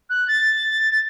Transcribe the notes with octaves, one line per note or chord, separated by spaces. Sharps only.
F#6
A6